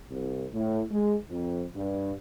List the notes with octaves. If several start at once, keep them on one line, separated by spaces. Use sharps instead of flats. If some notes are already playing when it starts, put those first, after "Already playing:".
C2
A2
G#3
F2
G2